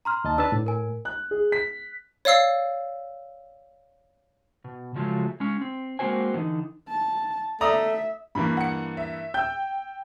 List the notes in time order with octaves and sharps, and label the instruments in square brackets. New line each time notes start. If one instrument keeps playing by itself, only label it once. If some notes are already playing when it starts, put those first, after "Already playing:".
[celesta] A#5 C6 F6
[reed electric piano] D#2 D#5 A5
[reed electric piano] D4 B4 A5 [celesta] E6
[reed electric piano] A2
[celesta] A#4 G#5
[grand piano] F#6
G#4
B6
[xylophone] C#5 D5 F5 E6 C7
[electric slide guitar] B2
C#3 F3 F#3 G#3 A3
G#3 C#4
C4
G#3 A#3 C4 F#4 C5 G#5
D3 E3 C#4 D#4
[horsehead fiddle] A5
[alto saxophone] A3 [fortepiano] D5 A#5 D#6 [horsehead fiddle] E5
[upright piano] G2 E3 A#3 [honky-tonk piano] B5
[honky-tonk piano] F#5 C#7
E5
[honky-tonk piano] G5 [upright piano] E6 G6